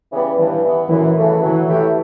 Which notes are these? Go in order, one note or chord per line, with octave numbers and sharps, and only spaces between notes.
C#3 E3 G3 B3
G2 E3
E3 B3
F#2 E3
C#3 E3 A3
E3 F#3
A3 E4 G4